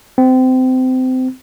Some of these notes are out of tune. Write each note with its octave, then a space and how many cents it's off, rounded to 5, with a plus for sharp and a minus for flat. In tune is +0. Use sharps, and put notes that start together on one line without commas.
C4 -25